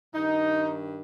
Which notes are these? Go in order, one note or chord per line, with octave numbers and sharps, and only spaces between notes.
G2 D#3 D#4